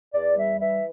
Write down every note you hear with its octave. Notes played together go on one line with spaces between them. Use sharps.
E2 D5
G3 E5
E3 E5